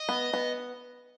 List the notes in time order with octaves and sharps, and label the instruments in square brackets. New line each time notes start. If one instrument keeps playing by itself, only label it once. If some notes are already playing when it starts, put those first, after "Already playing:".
Already playing: [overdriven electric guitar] D#5
[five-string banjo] B3
B3